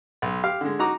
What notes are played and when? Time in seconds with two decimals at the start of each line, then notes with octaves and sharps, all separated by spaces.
0.22 B1
0.44 G4 F5
0.61 D3 G#3
0.79 D#4 F#4 A#5 D6